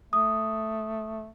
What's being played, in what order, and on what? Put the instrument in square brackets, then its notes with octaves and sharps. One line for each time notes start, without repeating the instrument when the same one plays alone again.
[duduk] A3 [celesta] D#6